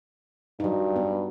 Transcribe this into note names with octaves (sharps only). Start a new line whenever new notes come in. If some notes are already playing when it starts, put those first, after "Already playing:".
G2 F#3 D#4
B3